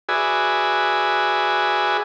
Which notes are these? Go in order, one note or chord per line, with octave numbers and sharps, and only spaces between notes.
F#4 G#4 B4 D5 E5 G#5